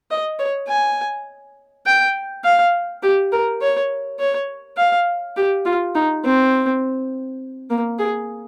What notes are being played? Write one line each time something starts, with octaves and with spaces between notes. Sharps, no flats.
D#5
C#5
G#5
G5
F5
G4
A#4
C#5
C#5
F5
G4
F4
D#4
C4
A#3
G#4